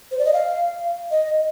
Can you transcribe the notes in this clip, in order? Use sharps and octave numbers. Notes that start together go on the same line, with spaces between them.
C5
D5
D#5
F5
D#5